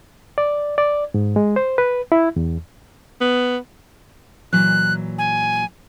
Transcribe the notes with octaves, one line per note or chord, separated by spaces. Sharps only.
D5
D5
G#2
G#3
C5
B4
E4
E2
B3
A#2 E3 F#3 F#6
G#5